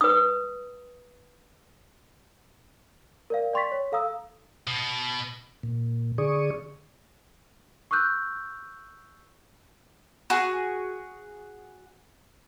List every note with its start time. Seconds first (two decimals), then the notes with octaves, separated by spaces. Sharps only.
0.01 B4 D#6
3.30 A#4 D5 F5
3.53 D5 G5 C6 C#6 A6 B6
3.72 C#5
3.92 A4 F5 A#5 D#6 E6
4.67 B2
5.63 A#2
6.18 D3 G#4 D5 C#6 D#6
7.91 C#6 D6 E6 F#6 G6
10.30 F#4 G#4